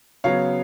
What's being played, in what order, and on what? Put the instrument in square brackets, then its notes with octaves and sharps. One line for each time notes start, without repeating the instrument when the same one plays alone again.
[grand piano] C#3 F#3 B3 C#5 F5